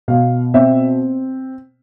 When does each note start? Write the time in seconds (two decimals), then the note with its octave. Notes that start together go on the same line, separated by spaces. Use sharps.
0.08 B2 F5
0.54 C4 E5